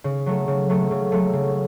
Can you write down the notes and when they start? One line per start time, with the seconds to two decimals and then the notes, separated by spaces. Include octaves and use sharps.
0.04 C#3
0.26 F#3 A3
0.48 C#3
0.69 F#3 A3
0.91 C#3
1.12 F#3 A3
1.33 C#3